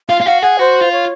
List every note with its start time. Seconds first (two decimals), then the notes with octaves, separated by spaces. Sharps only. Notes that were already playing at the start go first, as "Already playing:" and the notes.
0.09 F4 F5
0.21 F4
0.26 F#4 F5
0.42 G#4 F#5
0.59 F#4 C5
0.81 F4
0.92 C#5